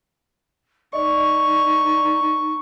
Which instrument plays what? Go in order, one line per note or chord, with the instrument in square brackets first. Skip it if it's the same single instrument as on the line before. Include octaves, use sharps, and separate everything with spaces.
[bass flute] D#4 [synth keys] D5 D#5 [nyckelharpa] C#6